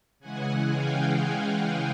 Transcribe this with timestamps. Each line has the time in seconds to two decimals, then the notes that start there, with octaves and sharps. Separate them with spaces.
0.20 C#3 E3 G#3 F#5 G#5
0.70 F5 G5